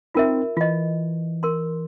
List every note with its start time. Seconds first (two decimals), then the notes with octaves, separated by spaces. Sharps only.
0.14 C4 D#4 F4 A#4 E5
0.57 E3 F4 D#5
1.43 A#4 C6